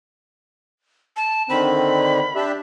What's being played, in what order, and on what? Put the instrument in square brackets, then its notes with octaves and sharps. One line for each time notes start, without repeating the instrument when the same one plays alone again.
[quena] A5
[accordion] D3 D#3 C4 [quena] B5
[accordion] D4 G4 E5